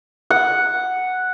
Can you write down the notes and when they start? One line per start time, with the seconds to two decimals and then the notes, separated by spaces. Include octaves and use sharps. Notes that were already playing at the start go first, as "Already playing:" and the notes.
0.30 F#5